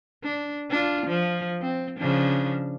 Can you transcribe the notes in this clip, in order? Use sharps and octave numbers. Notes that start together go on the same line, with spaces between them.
D4
D4 F4
F3
C4
C#3 F3 D4